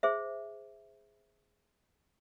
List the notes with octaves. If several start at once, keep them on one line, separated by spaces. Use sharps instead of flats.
G#4 C5 E5